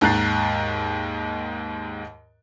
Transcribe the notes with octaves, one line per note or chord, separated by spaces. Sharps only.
D#2 G#2 A#5 F#6 A6 C7